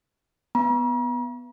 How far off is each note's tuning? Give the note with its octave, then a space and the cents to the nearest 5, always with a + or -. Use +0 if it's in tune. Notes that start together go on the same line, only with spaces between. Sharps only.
B3 +0 A#5 +45